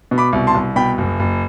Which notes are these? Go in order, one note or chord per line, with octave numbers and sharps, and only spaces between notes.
B2
B5 D6
C2
A5 C6
C2
B2 G5 B5
F#1
F#1